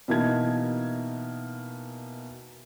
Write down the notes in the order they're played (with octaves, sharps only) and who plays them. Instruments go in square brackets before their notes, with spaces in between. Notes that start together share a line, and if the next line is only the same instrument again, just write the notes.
[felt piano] B2 E3 A#3 D#4 A5 G#6